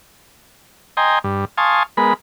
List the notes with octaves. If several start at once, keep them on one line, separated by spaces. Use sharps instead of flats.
D#5 G5 G#5 A#5 C6
G2
F5 G#5 A5 C6 C#6 D#6
G#3 B3 A#4 B5